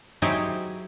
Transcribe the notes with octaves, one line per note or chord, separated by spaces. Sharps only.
F#3 D#4 E4 G4 G#4 C5